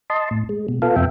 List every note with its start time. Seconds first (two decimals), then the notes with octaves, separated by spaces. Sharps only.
0.10 D#5 A5 C6
0.31 A2
0.49 G#3
0.68 B2
0.82 B3 F4 A4 F5
0.96 F2 C3 E5 G5